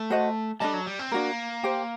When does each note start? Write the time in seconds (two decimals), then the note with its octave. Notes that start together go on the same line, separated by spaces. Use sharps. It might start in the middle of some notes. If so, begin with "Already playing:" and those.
Already playing: A3
0.10 F#4 C5 D#5 F#5
0.60 G3 D4 A4 D#5 A5
0.74 F#3
0.86 G3
0.99 C4
1.12 A#3 D4 F#4 A#4
1.63 G4 C5 G5